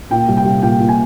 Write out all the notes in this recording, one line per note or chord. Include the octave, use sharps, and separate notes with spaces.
A#2 G5
C2
G5
C2
A#2 G5
A#2
G#5